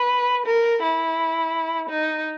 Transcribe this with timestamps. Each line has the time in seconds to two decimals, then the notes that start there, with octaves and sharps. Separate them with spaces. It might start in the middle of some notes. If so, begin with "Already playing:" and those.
Already playing: B4
0.46 A#4
0.83 E4
1.90 D#4